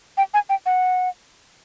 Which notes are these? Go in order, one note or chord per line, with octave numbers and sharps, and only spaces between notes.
G5
G#5
G5
F#5